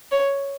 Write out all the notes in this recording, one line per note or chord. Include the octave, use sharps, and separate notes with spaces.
C#5